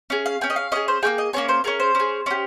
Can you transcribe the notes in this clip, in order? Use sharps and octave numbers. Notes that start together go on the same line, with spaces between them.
C#4 G#4
F5
C#4 G#4 G5
D#5
F5
C#4 G#4 D#5
C5
A#3 C#4 G#4 G5
D#5
A#3 C#4 G#4 C#5
C5
C#4 G#4 A#4
C5
C#4 G#4
C#4 G4